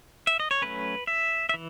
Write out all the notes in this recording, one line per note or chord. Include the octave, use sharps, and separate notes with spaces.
E5
D#5
C#5
F#3 A3 C#4 B4
E5
E5
E3